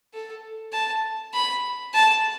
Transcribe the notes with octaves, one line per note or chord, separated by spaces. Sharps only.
A4
A5
B5
A5